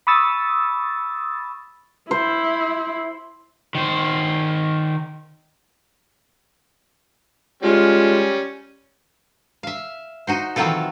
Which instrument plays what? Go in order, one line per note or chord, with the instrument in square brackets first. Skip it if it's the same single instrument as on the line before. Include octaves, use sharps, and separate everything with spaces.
[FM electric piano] B5 C#6 D#6 E6 A6
[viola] E4 [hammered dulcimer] C5
[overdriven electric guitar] D#3 C5
[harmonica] G3 C#4 [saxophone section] G#3 F4
[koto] E5 F5
D#4 F#4 C5
D#3 E3 F#3 C4 F4 A4